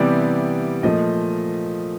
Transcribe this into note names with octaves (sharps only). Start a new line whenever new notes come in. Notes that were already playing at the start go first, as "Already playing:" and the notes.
Already playing: C3 E3 G3 B3 D5
A#2 F3 A3 D#5